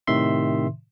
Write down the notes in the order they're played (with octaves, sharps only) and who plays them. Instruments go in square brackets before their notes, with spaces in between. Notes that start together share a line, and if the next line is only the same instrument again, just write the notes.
[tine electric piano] A2 C3 D#3 E5 C6